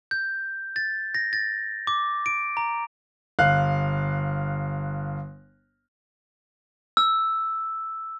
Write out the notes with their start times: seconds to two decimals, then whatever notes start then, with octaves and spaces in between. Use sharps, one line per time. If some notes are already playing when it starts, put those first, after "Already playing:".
0.11 G6
0.76 A6
1.15 A#6
1.33 A6
1.87 D6
2.26 D7
2.57 A#5
3.39 G1 F5 F#6
6.97 E6